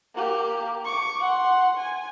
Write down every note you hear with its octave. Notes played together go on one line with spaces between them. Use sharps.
A#3 G4
C#6 D6
F#5 C6
G#5